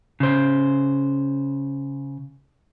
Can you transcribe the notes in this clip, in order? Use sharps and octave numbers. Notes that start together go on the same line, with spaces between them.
C#3 C5